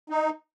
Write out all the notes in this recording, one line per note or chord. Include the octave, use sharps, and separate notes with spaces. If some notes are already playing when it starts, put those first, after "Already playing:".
D#4